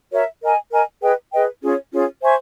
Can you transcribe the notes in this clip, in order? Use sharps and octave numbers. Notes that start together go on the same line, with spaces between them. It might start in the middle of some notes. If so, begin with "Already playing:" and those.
F#4 A#4 C#5 E5
A#4 D#5 G#5
A#4 D#5 G#5
G#4 B4 D#5 G5
G#4 B4 D#5 G5
C#4 F4 G#4 C#5
C#4 F4 G#4 C#5
C5 E5 G#5 C#6